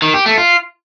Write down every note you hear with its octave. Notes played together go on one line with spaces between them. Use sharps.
D#3
G4
A3
F4